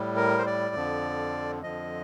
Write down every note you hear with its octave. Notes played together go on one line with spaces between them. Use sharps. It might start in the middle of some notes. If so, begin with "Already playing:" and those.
Already playing: A2 G3
A#4
C5
D5
F2 D3 F3
F2 D3 F3 D#5